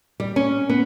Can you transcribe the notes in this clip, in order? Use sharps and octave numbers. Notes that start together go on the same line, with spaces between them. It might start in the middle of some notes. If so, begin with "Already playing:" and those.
G3
C#4
B3